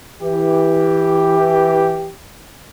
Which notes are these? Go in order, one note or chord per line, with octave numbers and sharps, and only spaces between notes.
E3 G4